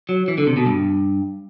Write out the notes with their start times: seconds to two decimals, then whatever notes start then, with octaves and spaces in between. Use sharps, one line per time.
0.09 F#3
0.28 E3
0.38 D3
0.47 C3
0.57 B2
0.66 G2